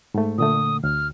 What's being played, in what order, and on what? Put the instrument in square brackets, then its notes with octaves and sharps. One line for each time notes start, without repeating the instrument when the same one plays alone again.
[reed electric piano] G#2 A3
[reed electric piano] A#2 D3 A3 [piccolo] D#6
[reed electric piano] D2 [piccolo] F6